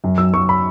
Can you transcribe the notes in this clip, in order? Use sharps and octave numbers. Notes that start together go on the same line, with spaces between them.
F#2
F#3 E6
F#3 C#6
B5